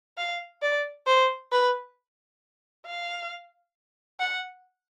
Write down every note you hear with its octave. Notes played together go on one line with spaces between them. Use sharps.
F5
D5
C5
B4
F5
F#5